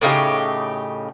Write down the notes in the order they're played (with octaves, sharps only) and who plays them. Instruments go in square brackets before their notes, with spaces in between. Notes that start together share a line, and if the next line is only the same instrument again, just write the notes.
[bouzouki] A2 C#3 D#4 G4